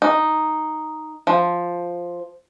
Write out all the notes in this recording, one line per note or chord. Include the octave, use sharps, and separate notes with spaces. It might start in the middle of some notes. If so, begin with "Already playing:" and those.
D#4
F3